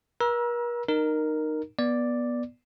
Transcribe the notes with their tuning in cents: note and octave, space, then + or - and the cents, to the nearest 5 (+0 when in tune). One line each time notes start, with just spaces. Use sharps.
A#4 +45 A#5 +35 E6 +0
D#4 -20 A#4 +0
B3 -15 D5 +0